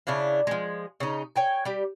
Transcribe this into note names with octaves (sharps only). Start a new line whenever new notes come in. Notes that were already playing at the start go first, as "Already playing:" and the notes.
C#3 D4 E4 F5
F3 G#3
C#3 D#4
C#5 G5 G#5
G3 G4